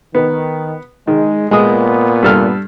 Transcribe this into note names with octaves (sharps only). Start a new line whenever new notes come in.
D#3 B3
D#3 G#3
A#2 G#3 B3 D#6
G2 A4 F6